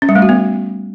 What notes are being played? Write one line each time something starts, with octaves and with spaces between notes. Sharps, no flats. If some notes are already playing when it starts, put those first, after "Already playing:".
C#4
G3
A3
F#4
B3